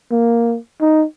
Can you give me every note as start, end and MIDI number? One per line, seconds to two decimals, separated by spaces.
0.11 0.57 58
0.81 1.05 63